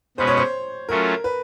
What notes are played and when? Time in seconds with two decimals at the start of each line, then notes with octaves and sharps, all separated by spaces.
0.17 B2 G#3 C#4 F#4 B4 C5
0.27 C#5
0.37 C5
0.89 F#3 A3 C#4 F4 A#4
1.24 B4